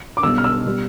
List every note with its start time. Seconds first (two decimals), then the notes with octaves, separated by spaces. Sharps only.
0.17 D6
0.23 B1 B2 G3 E6
0.38 F6
0.44 E6
0.66 B2 G3